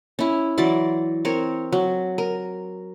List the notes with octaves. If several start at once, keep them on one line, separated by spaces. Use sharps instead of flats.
C#4 E4
E3 F#3 D5 C6
C4 A#4 C#5
F#3
A#4